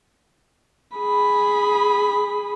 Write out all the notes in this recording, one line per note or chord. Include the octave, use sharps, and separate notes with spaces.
G#4 B5